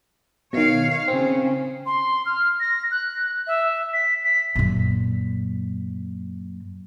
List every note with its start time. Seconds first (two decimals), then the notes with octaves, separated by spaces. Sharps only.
0.53 B2 D#3 C#5 F5
1.08 C#3 C4 C#4
1.86 C6
2.26 F6
2.60 A#6
2.91 F#6
3.47 E5
3.93 B6
4.24 B6
4.55 F#2 A#2